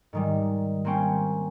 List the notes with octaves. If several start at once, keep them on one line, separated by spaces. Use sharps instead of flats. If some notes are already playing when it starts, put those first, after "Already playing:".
G#2 D#3 G3
A#3 C4 C#4 G5